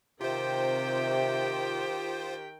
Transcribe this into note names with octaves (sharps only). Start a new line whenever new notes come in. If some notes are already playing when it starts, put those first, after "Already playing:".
C3 D#3 F4 G4 C5 G5